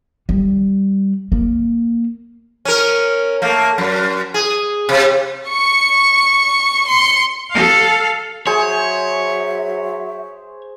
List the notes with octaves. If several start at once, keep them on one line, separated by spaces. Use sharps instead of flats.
G3
A#3
C#4 A#4
A3 A#3
F#2
G#4
C3
C#6 C#7
C6 C#7
A4 F5
F#3 G#4 C5 C#5 E5 G#5